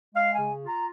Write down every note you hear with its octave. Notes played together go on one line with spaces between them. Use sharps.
G#3 F5
G#5
C#3
F4
A#5